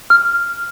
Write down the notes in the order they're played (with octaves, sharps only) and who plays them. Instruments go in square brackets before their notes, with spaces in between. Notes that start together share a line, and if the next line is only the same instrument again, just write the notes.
[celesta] F6